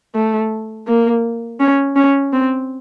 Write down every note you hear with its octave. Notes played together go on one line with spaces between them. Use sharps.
A3
A#3
C#4
C#4
C4